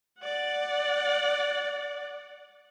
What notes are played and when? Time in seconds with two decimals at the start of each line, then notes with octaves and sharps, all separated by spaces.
0.20 D5 F#5